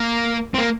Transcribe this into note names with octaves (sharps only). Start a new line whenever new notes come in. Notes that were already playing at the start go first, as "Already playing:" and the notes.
Already playing: A#3
C4
A#3